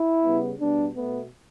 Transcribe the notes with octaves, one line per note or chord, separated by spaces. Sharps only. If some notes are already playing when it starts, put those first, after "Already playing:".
Already playing: E4
C#3 G3 B3
B2 G3 B3 D4
B2 A3 B3